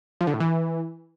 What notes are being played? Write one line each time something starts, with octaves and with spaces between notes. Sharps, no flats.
F3
D3
A2
E3